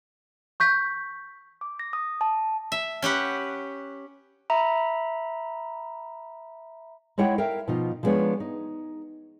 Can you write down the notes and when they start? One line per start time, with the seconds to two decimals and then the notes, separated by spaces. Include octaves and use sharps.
0.60 C#6 G6 B6
1.61 D6
1.79 A#6
1.93 D#6
2.21 A5
2.72 E5
3.02 C#4 G4 B4 F#5
4.50 E5 A#5 B5
7.18 G#3 E4 C#5 F#5 G5
7.38 A#4 E5 F5 G5
7.67 B2 F3 D#4 F4
8.03 F3 G3 G#3 B3 D4 C#5
8.40 D#4